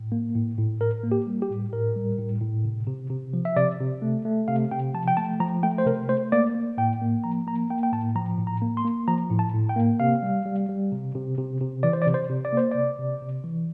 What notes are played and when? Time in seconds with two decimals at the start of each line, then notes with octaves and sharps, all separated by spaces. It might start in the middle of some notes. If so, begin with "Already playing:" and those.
Already playing: A2
0.12 A#3
0.35 A2
0.58 A2
0.81 A2 A#4
1.03 A#3
1.12 G4
1.27 G3
1.42 G4
1.50 A2
1.72 A2 A#4
1.96 G3
2.18 A2
2.41 A2
2.65 C3
2.87 C3
3.10 C3
3.33 F3
3.45 E5
3.57 C3 D5
3.80 C3
4.02 A3
4.25 A3
4.48 C3 F5
4.71 C3 G5
4.94 F3 A5
5.08 G5
5.17 A3 A5
5.40 F3 A#5
5.63 A3 G5
5.78 C5
5.86 C3 A#4
6.09 A3 C5
6.32 A#3 D5
6.55 A#3
6.78 A2 G5
7.02 A#3
7.24 F3 A#5
7.47 A#3 A#5
7.70 A#3 G5
7.83 G5
7.92 A2 A5
8.16 F3 A#5
8.38 A2
8.47 A#5
8.62 A#3
8.77 C6
8.85 A#3
9.08 F3 A#5
9.30 A2
9.39 A5
9.54 A2
9.69 G5
9.76 A#3
10.00 C3 F5
10.22 G3
10.45 G3
10.69 G3
10.92 C3
11.15 C3
11.38 C3
11.61 C3
11.83 E3 D5
11.93 C5
12.02 D5
12.06 C3
12.14 C5
12.29 C3
12.45 D5
12.53 A#3 C5
12.71 C3 D5
12.99 C3
13.22 C3
13.44 E3